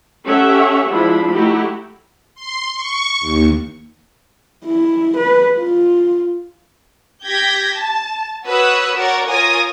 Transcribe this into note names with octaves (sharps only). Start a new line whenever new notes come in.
C#4 G4 A4 C#5 E5 F#5
F3 G#3 D4 E4 B5
A3 D#4 E4 F#4 G4
C6
C#6
D#2
E4
B4
F4
G4 G6 G#6 A#6 B6
A5
F#4 B4 C#5 D#6 E6 F#6
F#4 A#4 C#5 D5 F#5
F4 A#4 C#5 G#5 D#6 A#6